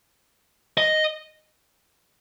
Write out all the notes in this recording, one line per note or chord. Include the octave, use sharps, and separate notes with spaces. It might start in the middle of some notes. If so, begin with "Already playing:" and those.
D#5